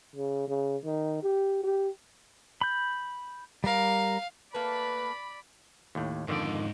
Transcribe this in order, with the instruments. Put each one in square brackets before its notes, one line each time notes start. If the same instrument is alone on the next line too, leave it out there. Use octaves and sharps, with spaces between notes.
[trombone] C#3
C#3
D#3
G4
G4
[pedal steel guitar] B5 G6
[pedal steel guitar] G3 A#4 [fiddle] F5
[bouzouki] A3 A#3 [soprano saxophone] B4 [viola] D5 B5
[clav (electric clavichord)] D#2 A2
[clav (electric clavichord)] F2 D3 D#3 [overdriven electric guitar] G#2 D5